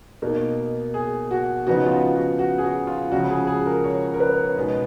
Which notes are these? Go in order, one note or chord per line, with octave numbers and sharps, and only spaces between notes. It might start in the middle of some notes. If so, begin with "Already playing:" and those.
B2 A#3 D#4
G#4
F#4
C#3 F3 B3 D#4 F#4
F4
F#4
F#4
F#4
G#4
F#4
F4
C#2 C#3 F3 F#4
G#4
G#4
A#4
C#5
A#4
B4
B2 G#3 B3 D#4